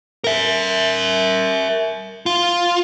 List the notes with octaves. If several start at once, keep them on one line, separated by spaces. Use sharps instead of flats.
A#4 E5
F4